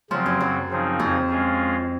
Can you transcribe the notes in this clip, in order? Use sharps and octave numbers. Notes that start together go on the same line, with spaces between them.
C#3 F3 F#3 C4
F#2
F#2
C#3 F3 C4 D#4 G#4
F2
G#3 C#4 F4 G#4